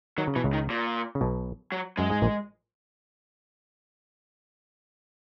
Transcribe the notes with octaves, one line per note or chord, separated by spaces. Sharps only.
D#3 F#3
C#3
B2 E3
C#2 C#3
D#3
A#2
C#3
B1 B2
F#3
F#2 G#3
G#2
A#1 A#2